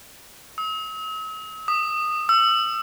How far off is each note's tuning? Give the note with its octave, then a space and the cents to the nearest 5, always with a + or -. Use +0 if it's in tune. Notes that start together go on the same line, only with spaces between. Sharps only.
E6 -45
D#6 -20
E6 +35